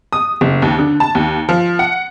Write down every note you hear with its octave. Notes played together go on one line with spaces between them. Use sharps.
D#6
F#1
D#2
D3
A5
D#2
F3
F#5